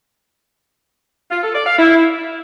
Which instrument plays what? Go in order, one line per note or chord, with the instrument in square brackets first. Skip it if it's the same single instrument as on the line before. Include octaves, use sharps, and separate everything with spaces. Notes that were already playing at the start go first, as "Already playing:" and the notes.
[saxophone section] F4
A4
D5
F5
E4